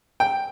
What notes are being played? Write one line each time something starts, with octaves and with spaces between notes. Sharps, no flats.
G5